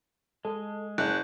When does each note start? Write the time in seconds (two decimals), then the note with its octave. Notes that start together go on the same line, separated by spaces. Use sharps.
0.45 G#3 A4
0.98 F#1 F#6